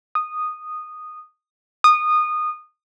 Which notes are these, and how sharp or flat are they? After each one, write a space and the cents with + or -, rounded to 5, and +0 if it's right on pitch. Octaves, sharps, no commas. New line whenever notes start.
D#6 -10
D#6 -20